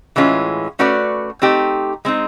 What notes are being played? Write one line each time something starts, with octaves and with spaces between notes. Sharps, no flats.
A2 E3 G#3 C#4 F4
A3 C#4 F#4 B4 D5
A3 C4 D#4 G4
G#3 C4 D#4